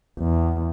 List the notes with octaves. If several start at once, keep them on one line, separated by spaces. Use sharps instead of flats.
E2